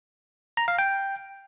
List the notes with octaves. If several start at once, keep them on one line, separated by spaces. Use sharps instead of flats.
A#5
F5
G5